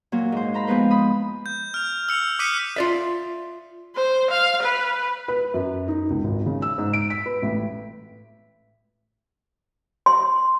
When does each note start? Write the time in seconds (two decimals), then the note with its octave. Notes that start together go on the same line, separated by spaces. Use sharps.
0.12 A#2 F#3 A#3
0.32 G#2 C5
0.54 C5 A#5 B5
0.67 F3 G#3 B3 B4 C5
0.91 B5 D#6
1.46 G6
1.74 F6 F7
2.09 E6 C#7 F7
2.39 D6 D#6 F#6 B6 C#7 D#7
2.76 F4 D5 E5
3.95 C5
4.30 F5
4.62 B4
5.28 B4
5.54 F#2
5.88 D#4
6.10 C#2
6.24 G#1
6.46 C#3
6.62 E6
6.78 G#2
6.93 D7
7.10 B6
7.26 B4
7.42 A1
10.06 C6